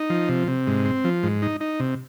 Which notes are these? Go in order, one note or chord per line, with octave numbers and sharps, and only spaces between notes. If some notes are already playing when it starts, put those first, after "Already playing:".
Already playing: D#4
F3
C3
C3
G#2
C4
F3
G#2
D#4
D#4
C3